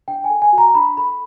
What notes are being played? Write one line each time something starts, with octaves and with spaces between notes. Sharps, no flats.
D4 G5
G#5
A4
G#5
F#4
A#5
D4 B5
A4 B5